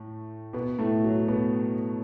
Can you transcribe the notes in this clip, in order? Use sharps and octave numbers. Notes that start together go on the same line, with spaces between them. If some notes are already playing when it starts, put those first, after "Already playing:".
Already playing: A2 A3
B2 B3
A2 A3
F#3
B2 B3